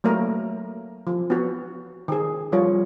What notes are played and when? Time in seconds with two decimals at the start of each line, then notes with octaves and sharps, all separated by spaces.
0.04 F#3 A3 A#3 A#4
1.07 F3
1.30 B3 F#4
2.08 D#3 G#4
2.52 F3 G3 F4 C#5